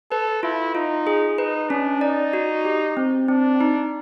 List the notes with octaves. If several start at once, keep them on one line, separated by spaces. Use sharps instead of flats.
A4 B4
E4 F4
D#4 F4
G#4
D#4 B4
C#4 D4
D#4 D5
F#4
G4
C4
C4 D4
D#4